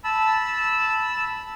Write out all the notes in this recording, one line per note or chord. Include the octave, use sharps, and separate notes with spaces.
A5 B5 E6